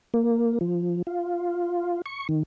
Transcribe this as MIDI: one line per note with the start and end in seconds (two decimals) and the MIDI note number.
0.14 0.59 58
0.61 1.02 53
1.07 2.02 65
2.06 2.27 85
2.29 2.43 51